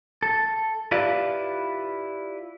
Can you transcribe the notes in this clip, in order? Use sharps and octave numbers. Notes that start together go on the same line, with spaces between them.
A4
E4 F4 G4 B4 D5 F5